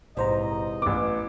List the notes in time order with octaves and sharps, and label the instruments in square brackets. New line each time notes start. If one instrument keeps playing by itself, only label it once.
[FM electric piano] A#1 C5 A#5 [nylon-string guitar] E2 G#2 C3 [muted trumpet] D#5
[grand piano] A1 D6 [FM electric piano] B3